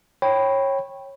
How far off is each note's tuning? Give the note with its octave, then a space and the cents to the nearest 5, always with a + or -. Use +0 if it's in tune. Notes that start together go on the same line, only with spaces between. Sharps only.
C#5 -20 G5 +0 B5 +0